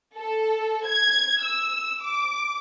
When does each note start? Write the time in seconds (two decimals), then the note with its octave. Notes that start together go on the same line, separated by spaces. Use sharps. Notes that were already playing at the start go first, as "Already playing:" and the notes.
0.16 A4
0.85 G#6
1.42 E6
2.03 D6